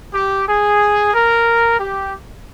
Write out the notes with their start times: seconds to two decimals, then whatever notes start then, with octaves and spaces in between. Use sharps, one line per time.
0.13 G4
0.47 G#4
1.13 A#4
1.79 G4